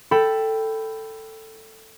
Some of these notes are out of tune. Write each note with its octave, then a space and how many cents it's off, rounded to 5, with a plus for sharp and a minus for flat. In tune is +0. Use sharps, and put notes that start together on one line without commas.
A4 +10 G5 +0 B5 +10